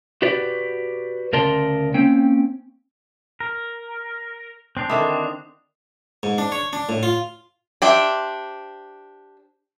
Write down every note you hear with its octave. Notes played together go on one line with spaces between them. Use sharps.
F#4 G4 B4 D5
D2 C#3 A#4 D5 A5 C6
A#3 C4 C#4 G5
A#4
C4 D4 F#6 C7 F7
D3 D#3 E4 D6 D#6
G#2
D4
C#5
D4
A2
F4
D4 G4 C5 E5